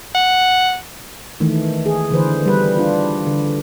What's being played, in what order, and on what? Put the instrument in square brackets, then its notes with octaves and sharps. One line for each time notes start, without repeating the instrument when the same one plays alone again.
[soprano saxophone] F#5
[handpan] D#3 E3 A3
G#4
D3 E3 B4 C5
G3 B4
D4 F4
D3